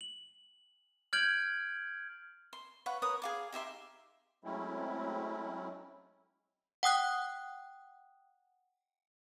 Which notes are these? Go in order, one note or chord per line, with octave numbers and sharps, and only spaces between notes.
F#7
F6 G6 G#6 D7 F#7
C6
B4 C#5 F5 F#5
A#4 B4 C#5 D#6
G#4 F5 D6
D#4 G4 E5 C6
F#3 G#3 A3 C4 C#4 E4
F#5 G5 D#6 F#6